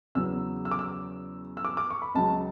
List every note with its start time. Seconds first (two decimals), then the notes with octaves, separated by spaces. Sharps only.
0.15 E2 C#3 F#3 E6
0.65 E6
0.71 D6
0.79 E6
1.57 E6
1.64 D6
1.77 D6
1.90 C#6
2.02 B5
2.15 C#2 C#3 F#3 A5